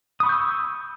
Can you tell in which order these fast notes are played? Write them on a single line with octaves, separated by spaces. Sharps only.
D#6 B5 C#6 G6 E6